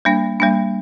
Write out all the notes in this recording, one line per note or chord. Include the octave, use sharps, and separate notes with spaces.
G3 A#3 D4
G3 A#3 D4